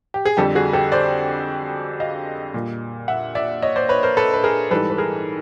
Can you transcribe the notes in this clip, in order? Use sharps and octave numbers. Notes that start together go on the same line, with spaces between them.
G4
G#4
F2 D3 G3 G4 A4
F#4 G#4
G4 A4
C5 D5
D#5 F5
A#2 G3
E5 F#5
D5 E5
C#5 D#5
C5 D5
B4 C#5
A#4 C5
A4 B4
B4
G#4 A#4
G#2 E3 G3 A4 B4
B4
G#4 A#4